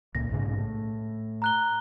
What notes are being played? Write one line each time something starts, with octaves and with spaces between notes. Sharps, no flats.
C#2 A#2 A#6
B1 G#2 C#3
A2
A#5 F#6 G7